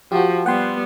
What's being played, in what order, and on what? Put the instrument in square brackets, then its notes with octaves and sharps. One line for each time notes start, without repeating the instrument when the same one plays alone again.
[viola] F3 [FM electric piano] F#4 G4
[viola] G3 B3 [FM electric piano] F#5 G5 C6